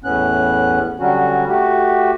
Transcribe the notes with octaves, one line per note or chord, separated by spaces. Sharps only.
E2 A2 B3 C#4 F#6
D3 F#3 G3 C#4 F#4
A3 F#4 G4